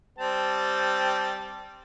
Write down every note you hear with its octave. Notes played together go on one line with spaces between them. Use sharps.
G3 C4 A5